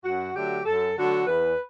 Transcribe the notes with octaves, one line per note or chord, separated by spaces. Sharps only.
F#2 F#4
D3 F#3 A3 G4
F#2 A4
D3 F#3 A3 F#4
E2 B4